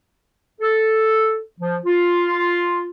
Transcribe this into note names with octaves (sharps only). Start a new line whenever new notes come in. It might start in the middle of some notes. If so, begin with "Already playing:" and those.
A4
F3
F4